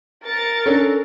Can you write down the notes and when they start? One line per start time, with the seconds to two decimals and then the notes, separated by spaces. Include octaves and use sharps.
0.25 A#4 A6 C#7
0.66 C#4 D4 A4